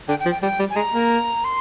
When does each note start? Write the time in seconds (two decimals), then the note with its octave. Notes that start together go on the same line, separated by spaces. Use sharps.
0.08 D3 G5
0.20 G5
0.25 F3
0.31 G5
0.42 G3 G5
0.59 G3
0.70 G#5
0.76 G#3 A#5
0.93 A#3
1.44 C6